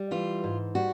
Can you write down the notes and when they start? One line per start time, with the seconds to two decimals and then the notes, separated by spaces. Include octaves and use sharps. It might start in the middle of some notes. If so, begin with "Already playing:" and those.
Already playing: G3
0.11 E3 F4
0.44 G#2
0.75 G3 F#4